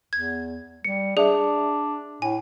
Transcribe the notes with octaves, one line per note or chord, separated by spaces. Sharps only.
E2 G#6
G3 C#7
D4 G#4 D5 E5
A2 G#5